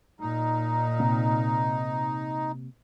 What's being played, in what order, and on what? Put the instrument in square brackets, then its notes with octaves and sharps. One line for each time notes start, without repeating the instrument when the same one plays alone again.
[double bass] A#2 [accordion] D#4
[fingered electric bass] C3 A#3 C4